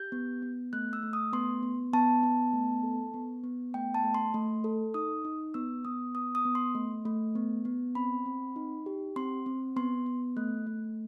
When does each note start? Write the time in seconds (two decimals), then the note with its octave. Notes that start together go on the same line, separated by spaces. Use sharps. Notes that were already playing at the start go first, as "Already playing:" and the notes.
Already playing: G4 G6
0.12 B3
0.42 B3
0.73 A3 F#6
0.93 E6
1.03 A3
1.13 D#6
1.33 B3 C6
1.63 B3
1.93 B3 A5
2.23 B3
2.53 A3
2.83 A4
3.14 B3
3.44 B3
3.74 A3 G5
3.94 A5
4.04 A3
4.14 C6
4.34 A3
4.64 A4
4.94 D#4 D#6
5.25 D#4
5.54 B3 E6
5.85 B3 D#6
6.15 B3 D#6
6.35 D#6
6.45 B3
6.55 C6
6.75 A3
7.05 A3
7.35 B3
7.65 B3
7.95 C4 B5
8.26 C4
8.56 D#4
8.86 G4
9.16 C4 C6
9.46 C4
9.76 B3 C6
10.06 B3
10.37 A3 F#6
10.67 A3